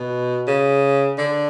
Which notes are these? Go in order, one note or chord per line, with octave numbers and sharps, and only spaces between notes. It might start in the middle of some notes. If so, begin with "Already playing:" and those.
Already playing: B2
C#3
D3